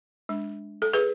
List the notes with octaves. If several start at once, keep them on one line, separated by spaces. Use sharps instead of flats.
G#3 D4
A4
G#4 B4